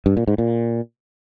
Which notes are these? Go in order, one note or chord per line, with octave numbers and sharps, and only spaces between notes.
G2
A#2
G#2
A#2